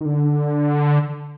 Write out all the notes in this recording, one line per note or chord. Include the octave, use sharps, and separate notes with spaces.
D#3
D3